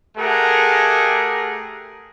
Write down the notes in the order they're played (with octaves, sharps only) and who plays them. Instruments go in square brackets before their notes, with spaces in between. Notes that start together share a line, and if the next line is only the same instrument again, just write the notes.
[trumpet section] A3 G4 G#4 A#4 F#5